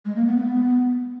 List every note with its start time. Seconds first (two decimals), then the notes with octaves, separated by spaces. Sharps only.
0.05 G#3
0.16 A#3
0.26 B3
0.37 B3